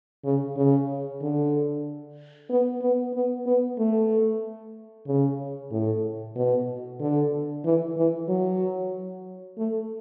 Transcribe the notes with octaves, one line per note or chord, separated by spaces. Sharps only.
C#3
C#3
D3
B3
B3
B3
B3
A3
C#3
A2
B2
D3
E3
E3
F#3
A3